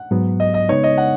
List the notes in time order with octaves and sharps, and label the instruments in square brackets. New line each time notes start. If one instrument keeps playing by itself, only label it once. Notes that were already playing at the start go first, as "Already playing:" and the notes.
Already playing: [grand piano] F#5
[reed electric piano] G#2 F#3 B3
[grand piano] D#5
D#5
[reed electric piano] C#3 G#3 B3 D#4 [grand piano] C#5
[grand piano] D#5
F#5